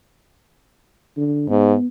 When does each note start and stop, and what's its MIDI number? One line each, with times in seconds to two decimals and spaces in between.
1.17 1.46 50
1.49 1.73 44
1.49 1.86 59